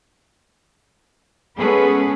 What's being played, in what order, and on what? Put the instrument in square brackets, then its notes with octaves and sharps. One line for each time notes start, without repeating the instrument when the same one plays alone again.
[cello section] G#3 B3 C#4 G#4 A4 B4